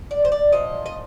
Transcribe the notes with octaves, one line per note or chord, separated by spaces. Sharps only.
D5
C5
D5
A#2 F3 D#5
D#5